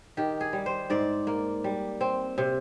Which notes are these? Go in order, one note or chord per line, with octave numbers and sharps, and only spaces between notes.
D#3 G4
G#4
G3
C5
G#2 D5
A#3
G3
C4
C3